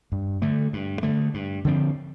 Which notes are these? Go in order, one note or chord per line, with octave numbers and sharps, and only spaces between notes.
G2
D3 A3
G2
D3 A3
G2
D3 F3 C4